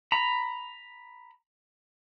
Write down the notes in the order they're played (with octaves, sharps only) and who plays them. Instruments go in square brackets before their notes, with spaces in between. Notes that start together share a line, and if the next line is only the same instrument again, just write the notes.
[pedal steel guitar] A#5 B5